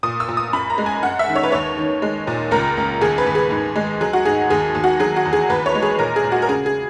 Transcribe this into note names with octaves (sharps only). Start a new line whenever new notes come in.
A#2 D#6
E6
A#2
D#6
F#2 B5
A#5
G#3
G#5
F#2 F#5
E5
D#3
C#5
B4
D#2 C#5
D#3
G#3
A#2
C#2 A#4
C#2
D#2 G#4
B4
D#2
G#4
G#2
G#3
F#3 G#4
F#4
G#2 G#4
D#2 G#4
D#2
F#4
F#3 G#4
F#4
E2
G#4
D#2 B4
C#5
G#3
G#4
A#2 A#4
G#4
A#2
F#4
A#4
C#3 G#4
G#4